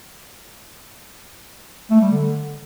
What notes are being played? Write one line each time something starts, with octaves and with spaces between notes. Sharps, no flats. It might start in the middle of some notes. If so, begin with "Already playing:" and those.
A3
G3
D3